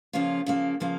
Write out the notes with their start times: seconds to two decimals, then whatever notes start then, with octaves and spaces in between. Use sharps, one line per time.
0.13 C#3 F3 A#3 C#4 F4
0.46 C#3 F3 A#3
0.80 C#3 F3 A#3